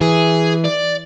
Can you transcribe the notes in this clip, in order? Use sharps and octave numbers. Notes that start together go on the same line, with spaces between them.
E3 G#4
D5